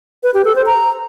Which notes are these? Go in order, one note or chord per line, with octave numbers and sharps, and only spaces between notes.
B4
G4
A4
C5
A#5